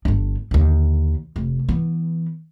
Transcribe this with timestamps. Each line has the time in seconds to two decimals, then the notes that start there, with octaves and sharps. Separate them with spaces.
0.05 G1 D4
0.51 D#2 D3
1.36 F1
1.68 E3 B3